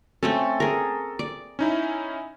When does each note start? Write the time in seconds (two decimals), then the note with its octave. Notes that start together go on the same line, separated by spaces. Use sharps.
0.23 A3 C4 C#4 A4
0.60 G#4 A#4
1.19 D5
1.59 C#4 D#4 E4